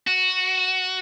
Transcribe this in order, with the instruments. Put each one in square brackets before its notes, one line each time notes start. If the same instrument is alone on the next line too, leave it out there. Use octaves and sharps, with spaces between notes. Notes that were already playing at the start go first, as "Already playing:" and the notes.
[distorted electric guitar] F#4